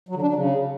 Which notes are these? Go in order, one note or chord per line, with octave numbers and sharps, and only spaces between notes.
F#3
D3
D4
F#3
C#3